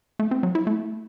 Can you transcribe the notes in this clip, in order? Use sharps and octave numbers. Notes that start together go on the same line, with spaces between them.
A3
C4
F#3
E4
A3